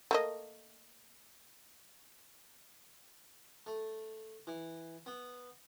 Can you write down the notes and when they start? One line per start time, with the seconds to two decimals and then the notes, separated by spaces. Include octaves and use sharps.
0.11 A3 A#3 D#5
3.66 A3
4.47 E3
5.06 B3